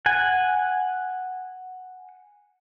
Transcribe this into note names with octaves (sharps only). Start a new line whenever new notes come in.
F#5 G#5